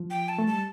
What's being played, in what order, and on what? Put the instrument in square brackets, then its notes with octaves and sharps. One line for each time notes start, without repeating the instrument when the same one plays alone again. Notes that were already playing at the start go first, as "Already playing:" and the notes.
Already playing: [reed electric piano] F3
[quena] G5
A5
[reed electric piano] A3
[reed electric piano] G3 [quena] A5